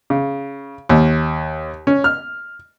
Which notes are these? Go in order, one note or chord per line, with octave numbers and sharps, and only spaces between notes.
C#3
D#2
C#4
F6